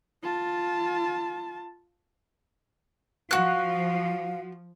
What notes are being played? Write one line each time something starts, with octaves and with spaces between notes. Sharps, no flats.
F4 A5
F3 F#4 F5 F#6